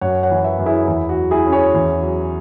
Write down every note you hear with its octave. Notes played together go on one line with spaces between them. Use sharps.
F#2 C#5 F#5
C#5 F#5
E3
B4 E5
F#2
E4 G#4
E2 E4
F#4
F#3
E4 G#4
C#4
G#4 C#5
E2
F#3